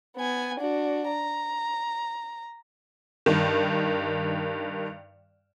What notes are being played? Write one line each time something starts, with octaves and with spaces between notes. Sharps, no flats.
B3 G#5
D4 F#4
A#5
G2 D#3